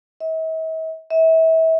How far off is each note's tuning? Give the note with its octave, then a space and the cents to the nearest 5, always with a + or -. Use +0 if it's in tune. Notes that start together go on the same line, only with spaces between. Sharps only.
E5 -45
E5 -30